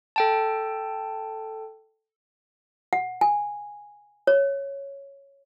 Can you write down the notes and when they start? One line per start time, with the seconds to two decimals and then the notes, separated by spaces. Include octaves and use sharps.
0.16 A4 G5 A5
2.93 F#5
3.21 G#5
4.27 C#5